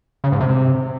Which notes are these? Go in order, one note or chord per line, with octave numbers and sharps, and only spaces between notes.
C#3
G#2
C3